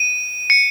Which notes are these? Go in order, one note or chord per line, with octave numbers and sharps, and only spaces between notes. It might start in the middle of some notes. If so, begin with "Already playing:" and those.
Already playing: D#7
C#7